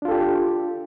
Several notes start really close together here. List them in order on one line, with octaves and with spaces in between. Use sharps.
D4 F4 A4 G4